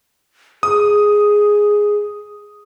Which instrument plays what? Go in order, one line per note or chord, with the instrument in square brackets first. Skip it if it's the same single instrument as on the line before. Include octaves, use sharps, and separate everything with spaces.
[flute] G#4 [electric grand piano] D#6